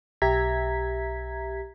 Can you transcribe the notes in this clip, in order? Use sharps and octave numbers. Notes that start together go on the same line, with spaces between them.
B1 G4 E5 A#5 G#6 B6